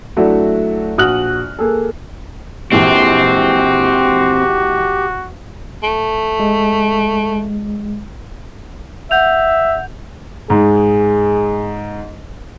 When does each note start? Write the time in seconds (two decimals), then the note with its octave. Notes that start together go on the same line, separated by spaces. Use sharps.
0.17 F#3 A3 D4 E4 F#4
0.98 A#1 F#4 D#6 F6 F#6 F#7
1.59 A#3 G#4 A4
2.72 A#1 E3 G#3 C4 F#4 G4
5.83 A3
6.40 G#3
9.11 E5 F#5 G6 F7
10.50 G#2 G#4